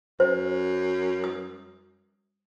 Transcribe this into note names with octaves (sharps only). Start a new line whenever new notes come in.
F#2 C5
D#6